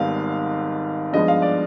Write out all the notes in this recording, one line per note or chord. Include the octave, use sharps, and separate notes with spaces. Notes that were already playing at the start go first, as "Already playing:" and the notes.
Already playing: G#1 G#2 G3 B3 F5
G2 F3 G#3 B3 D#5
F5
D5